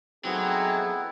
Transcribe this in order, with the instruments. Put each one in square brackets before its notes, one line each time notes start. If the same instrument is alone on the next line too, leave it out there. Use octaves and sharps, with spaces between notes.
[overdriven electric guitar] F#3 [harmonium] A3 D#4 G#4 [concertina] B3 E4 [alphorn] C4